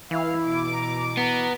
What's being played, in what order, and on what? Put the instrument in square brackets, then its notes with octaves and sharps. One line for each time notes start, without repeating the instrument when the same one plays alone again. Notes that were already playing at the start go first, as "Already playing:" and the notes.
[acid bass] E3 [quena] E4 [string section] F5
[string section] B2 D6
[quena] A#5
[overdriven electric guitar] B3 [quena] A#5